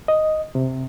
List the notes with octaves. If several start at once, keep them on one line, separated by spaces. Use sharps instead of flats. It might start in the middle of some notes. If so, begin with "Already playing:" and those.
D#5
C3